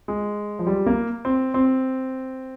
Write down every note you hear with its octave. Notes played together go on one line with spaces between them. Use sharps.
G#3
F3
G3
A#3
C4
C4